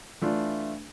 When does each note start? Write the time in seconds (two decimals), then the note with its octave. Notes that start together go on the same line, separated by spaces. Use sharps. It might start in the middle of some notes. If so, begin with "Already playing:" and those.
0.21 E3 A3 D4 F4